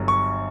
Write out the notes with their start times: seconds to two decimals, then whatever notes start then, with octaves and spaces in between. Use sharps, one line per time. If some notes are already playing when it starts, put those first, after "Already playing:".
Already playing: G1 G2 F#3
0.08 C#6